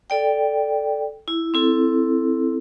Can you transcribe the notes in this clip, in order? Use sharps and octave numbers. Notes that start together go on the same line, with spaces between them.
A4 D5 G5
E4
C4 E4 A4